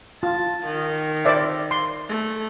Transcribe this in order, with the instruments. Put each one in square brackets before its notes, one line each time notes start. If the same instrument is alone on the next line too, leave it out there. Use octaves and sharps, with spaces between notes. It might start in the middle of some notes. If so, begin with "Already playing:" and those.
[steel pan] F4 [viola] A5
[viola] D#3
[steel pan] C5 D5 E5
C6
[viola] A3